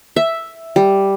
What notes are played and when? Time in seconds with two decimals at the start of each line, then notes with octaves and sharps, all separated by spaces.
0.16 E5
0.76 G3